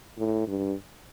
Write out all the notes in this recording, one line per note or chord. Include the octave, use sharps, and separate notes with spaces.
A2
G2